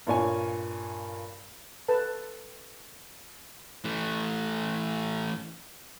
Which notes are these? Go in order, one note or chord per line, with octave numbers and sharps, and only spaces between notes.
G2 A#2 C#5 G#5
A4 B4 A5
E3 A3